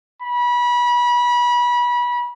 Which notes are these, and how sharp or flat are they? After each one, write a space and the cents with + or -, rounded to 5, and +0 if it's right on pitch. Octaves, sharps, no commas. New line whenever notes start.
B5 -30